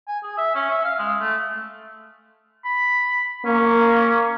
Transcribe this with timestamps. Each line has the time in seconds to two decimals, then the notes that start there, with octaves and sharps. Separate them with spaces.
0.08 G#5
0.23 G#4
0.38 E5
0.55 C#4
0.71 E5
0.84 F5
0.99 G#3
1.20 A3
2.65 B5
3.45 A#3 C#4